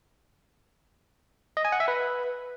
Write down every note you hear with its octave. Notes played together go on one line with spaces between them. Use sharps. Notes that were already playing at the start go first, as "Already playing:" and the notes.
D#5
G#5
F#5
E5
B4